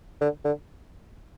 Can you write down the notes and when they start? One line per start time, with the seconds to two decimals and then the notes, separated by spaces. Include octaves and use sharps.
0.21 D3
0.45 D3